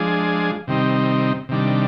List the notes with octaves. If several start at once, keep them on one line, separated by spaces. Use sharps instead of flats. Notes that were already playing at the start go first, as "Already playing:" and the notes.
Already playing: F3 G#3 D4 G#4
C3 D#3 G3 C4 D#4
C3 D#3 G3 D4